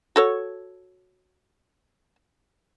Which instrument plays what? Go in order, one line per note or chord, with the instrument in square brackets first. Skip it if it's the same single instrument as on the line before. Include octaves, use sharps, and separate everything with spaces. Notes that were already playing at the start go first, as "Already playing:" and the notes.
[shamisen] F#4 A4 C#5